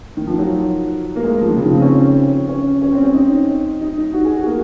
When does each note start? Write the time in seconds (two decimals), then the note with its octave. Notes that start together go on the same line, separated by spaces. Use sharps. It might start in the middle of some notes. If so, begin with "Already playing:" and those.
0.17 D#3
0.27 F3
0.38 F#3
1.16 A#3
1.24 G#3
1.41 F3
1.49 D#3
1.57 C#3
1.65 F3
1.74 C4
1.81 C#4
2.48 C#4
2.82 C#4
2.93 C4
3.03 C#4
3.14 D#4
3.81 D#4
3.98 D#4
4.13 F#4
4.25 G#4
4.36 F#4
4.46 A#3